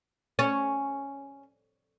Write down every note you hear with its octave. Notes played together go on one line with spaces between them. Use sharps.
C#4